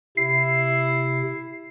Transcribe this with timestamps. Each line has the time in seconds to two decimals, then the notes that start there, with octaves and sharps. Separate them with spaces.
0.17 C3 E4 C7